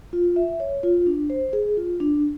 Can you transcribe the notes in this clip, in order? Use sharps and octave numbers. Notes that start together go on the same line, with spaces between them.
F4
E5
C#5
F4
D4
C5
G#4
F4
D4